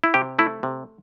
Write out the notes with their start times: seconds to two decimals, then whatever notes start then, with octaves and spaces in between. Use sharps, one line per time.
0.04 E4
0.14 C3 G4
0.39 A3 E4
0.63 C3